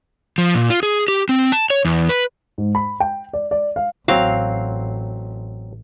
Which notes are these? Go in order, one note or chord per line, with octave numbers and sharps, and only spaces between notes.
F3
A#2
F4
G#4
G4
C4
A5
C#5
E2
B4
G#2
B5
G5
D5
D5
F5
A1 F#3 C4 F5